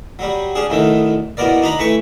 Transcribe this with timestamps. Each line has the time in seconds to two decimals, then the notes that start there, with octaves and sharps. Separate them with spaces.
0.19 F#3 G3
0.55 C#4 D4 G#4
0.70 B1 E2 D#3 A3
1.37 E2 B2 B3 A#4 D5
1.62 D4 D#4 A#5 B5
1.79 E3 A3 B4 C#6